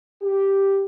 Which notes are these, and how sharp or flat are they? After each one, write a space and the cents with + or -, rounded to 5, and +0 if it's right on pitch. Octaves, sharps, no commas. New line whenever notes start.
G4 +0